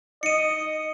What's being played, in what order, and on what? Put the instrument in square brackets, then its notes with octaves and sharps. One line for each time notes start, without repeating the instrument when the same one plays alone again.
[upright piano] D#4 [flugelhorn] D#5 [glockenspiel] C#7 D#7